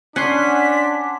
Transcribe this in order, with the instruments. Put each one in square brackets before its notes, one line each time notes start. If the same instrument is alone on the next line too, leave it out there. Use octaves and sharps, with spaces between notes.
[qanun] C#4 [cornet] D4 [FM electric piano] F#5 G#5 C6 [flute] B6